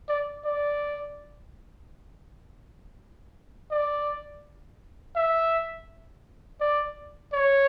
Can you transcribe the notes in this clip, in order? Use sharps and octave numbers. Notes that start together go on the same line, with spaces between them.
D5
D5
D5
E5
D5
C#5